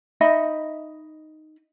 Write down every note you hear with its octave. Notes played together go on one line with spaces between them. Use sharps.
D#4 D#5 E5 B5